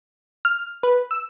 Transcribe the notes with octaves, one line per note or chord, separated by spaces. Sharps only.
F6
B4
E6